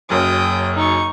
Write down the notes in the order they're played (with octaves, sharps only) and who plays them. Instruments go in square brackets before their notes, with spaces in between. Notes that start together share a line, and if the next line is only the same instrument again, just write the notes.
[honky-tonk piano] F#1 F#2 C#5 [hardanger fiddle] G5 D#6
[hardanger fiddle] D#4 C#6